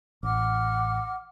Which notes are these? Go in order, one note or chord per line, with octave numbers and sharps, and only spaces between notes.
A1 F#5 D6 F6